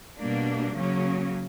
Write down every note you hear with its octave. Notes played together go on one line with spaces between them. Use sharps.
B2 G3 A#3 D4
C#3 F#3 A#3 C#4